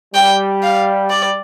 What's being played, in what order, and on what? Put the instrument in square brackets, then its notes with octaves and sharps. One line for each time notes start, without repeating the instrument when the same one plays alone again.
[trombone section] G3 [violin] G5
[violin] F5
D5